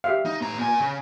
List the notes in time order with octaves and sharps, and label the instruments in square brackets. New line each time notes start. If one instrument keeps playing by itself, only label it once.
[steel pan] G4 E5 F5
[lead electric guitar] D#4
A2 A#5
A#2 G#5
C#3